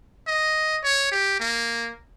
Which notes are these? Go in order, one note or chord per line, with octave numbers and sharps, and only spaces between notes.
D#5
C#5
G4
A#3